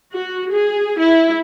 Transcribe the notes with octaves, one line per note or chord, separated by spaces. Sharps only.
F#4
G#4
E4